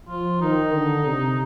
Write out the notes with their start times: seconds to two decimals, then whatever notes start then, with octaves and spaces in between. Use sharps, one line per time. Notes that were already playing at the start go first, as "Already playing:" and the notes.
0.09 F3 F4
0.41 D#3 D#4
0.73 D3
1.06 C3